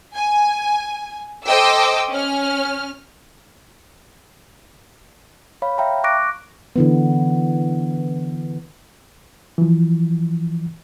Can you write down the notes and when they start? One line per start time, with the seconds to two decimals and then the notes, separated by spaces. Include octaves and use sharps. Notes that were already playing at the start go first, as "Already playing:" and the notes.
0.15 G#5
1.46 A4 C5 D#5 G5 D6 E6
2.11 C#4 F6
5.62 C#5 F5 B5
5.78 E5 F5 G5 A#5
6.04 C#6 D6 F#6 A#6 D7
6.76 D3 E3 B3
9.58 E3 F3